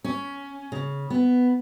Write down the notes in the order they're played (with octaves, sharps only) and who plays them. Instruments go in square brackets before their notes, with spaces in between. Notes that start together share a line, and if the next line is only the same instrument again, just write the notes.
[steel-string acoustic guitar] C#4
C#3
B3